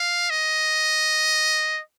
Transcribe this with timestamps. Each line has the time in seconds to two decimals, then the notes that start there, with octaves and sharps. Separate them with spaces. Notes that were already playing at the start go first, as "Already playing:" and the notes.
Already playing: F5
0.30 D#5